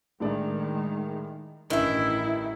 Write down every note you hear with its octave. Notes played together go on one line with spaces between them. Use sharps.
A2 D#3 G#3 D4 D5
A1 G2 D#3 C#4 E4 E5